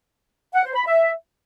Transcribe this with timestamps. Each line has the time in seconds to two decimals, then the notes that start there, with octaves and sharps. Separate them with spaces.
0.54 F#5
0.64 C5
0.75 B5
0.85 E5